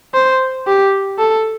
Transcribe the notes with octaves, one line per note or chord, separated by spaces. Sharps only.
C5
G4
A4